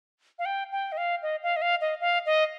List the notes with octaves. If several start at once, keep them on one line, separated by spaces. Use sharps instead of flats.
F5
G5
G5
D#5
F5
D#5
F5
D#5
F5
D#5
F5
D#5